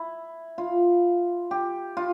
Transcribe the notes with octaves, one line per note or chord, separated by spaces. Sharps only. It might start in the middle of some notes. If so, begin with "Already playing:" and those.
Already playing: E4
F4
G4
F4